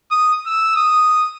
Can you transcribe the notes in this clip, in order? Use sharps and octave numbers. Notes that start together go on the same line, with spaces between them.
D#6
E6
D#6